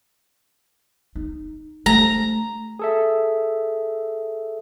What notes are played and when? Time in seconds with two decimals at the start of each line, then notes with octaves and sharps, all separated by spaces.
1.15 D#4
1.86 A3 A#5
2.79 G#4 A4 E5